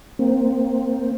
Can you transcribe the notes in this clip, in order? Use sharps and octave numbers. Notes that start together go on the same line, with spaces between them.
A#3 C4